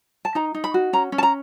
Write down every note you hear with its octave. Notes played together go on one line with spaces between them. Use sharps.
A5
D#4 A#5
D#4
B5
F#4
C#4 A#5
C#4
A5
A#5